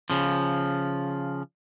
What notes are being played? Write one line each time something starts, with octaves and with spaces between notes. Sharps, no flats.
C#3 F3